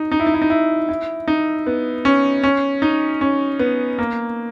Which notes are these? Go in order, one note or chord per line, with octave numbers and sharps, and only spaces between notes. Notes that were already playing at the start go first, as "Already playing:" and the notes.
Already playing: D#4
D#4
E4
D#4
E4
D#4
E4
E4
D#4
B3
C#4
C#4
D#4
C#4
B3
A#3